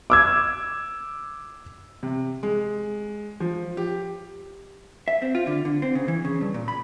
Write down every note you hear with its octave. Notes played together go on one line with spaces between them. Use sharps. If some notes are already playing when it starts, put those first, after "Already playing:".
D6 E6 G#6
C3
G#3
F3
G4
E5
C4
F4
D3
D3
C4
C#3
E3
C#3
G2
A#2
B5